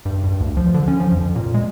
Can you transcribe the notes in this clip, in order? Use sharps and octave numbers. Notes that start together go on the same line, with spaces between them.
G2
G2
D2
F3
D3
C#4
F3
F2
A#2
G#3